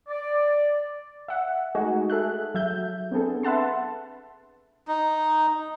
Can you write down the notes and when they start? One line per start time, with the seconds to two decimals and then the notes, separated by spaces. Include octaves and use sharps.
0.08 D5
1.28 E5 F#5
1.75 G#3 A3 D#4 F#4 G#4
2.10 G#4 A4 E5 F#6
2.55 F#3 E5 G6
3.11 B3 C4 D4 G#4 A4
3.43 B4 E5 F#5 A5 C6
4.88 D#4